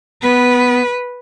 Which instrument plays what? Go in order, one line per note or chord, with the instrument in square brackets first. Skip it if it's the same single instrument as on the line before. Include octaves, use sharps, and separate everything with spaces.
[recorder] B3 [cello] B4